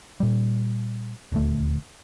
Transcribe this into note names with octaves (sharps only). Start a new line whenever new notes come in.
A#2 G3
D#1 D2 A3